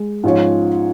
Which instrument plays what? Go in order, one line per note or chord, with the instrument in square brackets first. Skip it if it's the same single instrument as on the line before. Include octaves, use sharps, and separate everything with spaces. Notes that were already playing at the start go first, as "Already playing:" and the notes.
Already playing: [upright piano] G#3
G#2 F3 C#4 F4 C#5